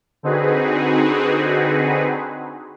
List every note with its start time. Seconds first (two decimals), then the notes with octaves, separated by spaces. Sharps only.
0.23 D3 C4 D#4 F#4 G#4 B4